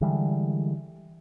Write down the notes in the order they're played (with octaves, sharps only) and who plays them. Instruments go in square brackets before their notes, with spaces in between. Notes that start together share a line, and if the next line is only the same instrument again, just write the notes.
[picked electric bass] D3 E3 G3 G#3